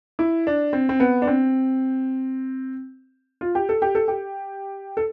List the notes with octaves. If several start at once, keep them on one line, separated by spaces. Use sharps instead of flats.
E4
D4
C4
C4
B3
D4
C4
F4
G4
A4
G4
A4
G4
A4